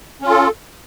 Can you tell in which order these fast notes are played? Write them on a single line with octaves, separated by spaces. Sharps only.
C#4 F4 A4